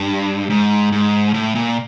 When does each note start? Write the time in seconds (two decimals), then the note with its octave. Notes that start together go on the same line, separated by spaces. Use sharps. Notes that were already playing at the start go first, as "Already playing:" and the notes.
Already playing: G2
0.50 G#2
0.92 G#2
1.34 A2
1.55 A#2